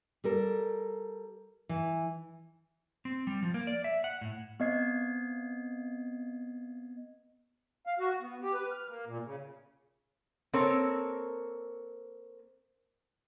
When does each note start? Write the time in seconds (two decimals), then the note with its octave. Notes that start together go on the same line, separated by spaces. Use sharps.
0.24 G3 A4 A#4
1.69 E3
3.05 C4
3.27 G3
3.43 F3
3.54 A#3
3.67 D5
3.84 E5
4.04 F#5
4.21 A2
4.60 B3 C4 D#5 G#6 C7
7.87 F5
7.99 F#4
8.22 B3
8.42 G4
8.54 B4
8.71 F6
8.88 A#3
9.07 A#2
9.25 C#3
10.53 A#3 C4 A4 A#4 C#5